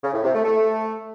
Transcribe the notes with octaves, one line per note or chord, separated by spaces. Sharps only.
C#3
A2
C3
A3
A3